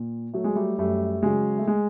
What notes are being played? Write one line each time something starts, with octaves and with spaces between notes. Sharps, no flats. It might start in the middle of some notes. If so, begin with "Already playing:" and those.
Already playing: A#2
F#3 A3
G#3
G3 A3
F#2 G3 A3
C#3 F#3 G#3
A3
G#3